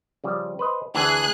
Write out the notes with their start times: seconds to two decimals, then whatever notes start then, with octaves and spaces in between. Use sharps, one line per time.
0.24 C#3 F3 G3
0.59 B4 C5 D#5
0.95 D2 E3 G#4 A5 F#6